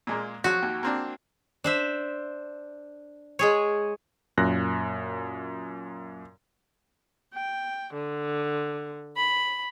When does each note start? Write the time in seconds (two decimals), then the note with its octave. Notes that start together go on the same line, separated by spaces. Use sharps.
0.07 A#2 G#3 A#3
0.44 F3 F#3 F#4 C#6
0.62 D#2
0.83 A#3 C4 D4
1.64 D4 C5 E5
3.39 G#3 G#4 C#5
4.38 F#2 A#2 F#6 A#6
7.34 G5
7.93 D3
9.17 B5